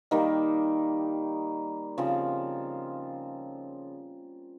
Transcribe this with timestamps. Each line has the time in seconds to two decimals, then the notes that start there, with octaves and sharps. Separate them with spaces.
0.11 D#3 G3 A#3 D#4
1.98 C#3 F3 C4 F4